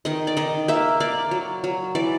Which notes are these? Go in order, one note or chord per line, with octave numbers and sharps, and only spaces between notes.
D#3 D#5
D5
D#3 D#5
A#3 E5
A#3 D5
F#3
F#3
E3 D5